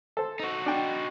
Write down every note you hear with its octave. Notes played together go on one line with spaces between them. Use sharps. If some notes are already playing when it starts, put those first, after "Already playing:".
A4 C5
D#4 F#4
D4 G5